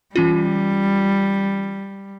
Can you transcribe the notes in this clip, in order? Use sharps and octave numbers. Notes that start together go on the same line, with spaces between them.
E3 G3 C#4 F4